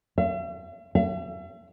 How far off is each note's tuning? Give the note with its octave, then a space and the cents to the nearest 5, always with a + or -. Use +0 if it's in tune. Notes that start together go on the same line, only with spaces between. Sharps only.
E5 +45
E5 +40